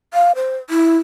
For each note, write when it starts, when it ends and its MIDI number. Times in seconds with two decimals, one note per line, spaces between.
0.14 0.32 77
0.36 0.57 72
0.70 0.97 64